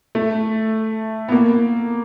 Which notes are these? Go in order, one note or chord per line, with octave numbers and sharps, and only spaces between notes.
A3
B3
A#3